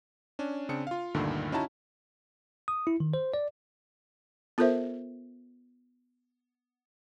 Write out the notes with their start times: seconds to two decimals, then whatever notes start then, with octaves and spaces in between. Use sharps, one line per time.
0.39 C#4 D4
0.69 C#3 C4 D4 C#7
0.87 F4 F5
1.14 D2 G2 A#2 D3 D#3
1.52 C#4 D#4 E4 F#4 A5 A#5
2.68 D#6
2.87 E4
3.00 D#3
3.14 C5
3.34 D5
4.58 B3 F4 A4 A#4 C5 E5